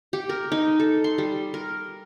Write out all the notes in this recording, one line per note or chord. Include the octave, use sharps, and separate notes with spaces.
G4
A#4
D#4
A4
C6
G3
A#4